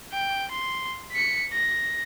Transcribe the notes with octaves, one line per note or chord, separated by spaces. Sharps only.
G5
C6
B6 C#7
A#6